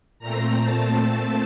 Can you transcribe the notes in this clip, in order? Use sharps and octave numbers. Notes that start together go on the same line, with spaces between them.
A#2 A3 C4 A#5
A5